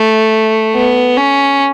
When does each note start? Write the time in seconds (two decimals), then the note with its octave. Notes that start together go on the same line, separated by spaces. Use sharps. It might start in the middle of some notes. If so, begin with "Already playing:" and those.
Already playing: A3
0.75 B3
1.17 C#4